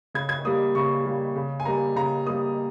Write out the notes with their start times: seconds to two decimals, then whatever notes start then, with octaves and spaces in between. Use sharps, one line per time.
0.14 C#3 G#6
0.29 G#6
0.45 G3 A#3 D#6
0.75 C#3 C#6
1.06 G3 A#3
1.36 C#3
1.60 G#5
1.65 G3 A#3 A#5
1.96 C#3 A#5
2.26 G3 A#3 D#6